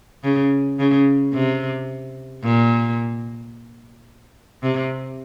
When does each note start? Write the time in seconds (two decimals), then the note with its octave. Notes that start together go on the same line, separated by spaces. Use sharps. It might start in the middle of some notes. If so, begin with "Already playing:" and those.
0.24 C#3
0.79 C#3
1.34 C3
2.43 A#2
4.63 C3